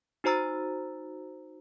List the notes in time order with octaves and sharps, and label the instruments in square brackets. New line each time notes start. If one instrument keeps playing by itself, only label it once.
[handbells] D#4 F#4 C5 A#5 E6 A6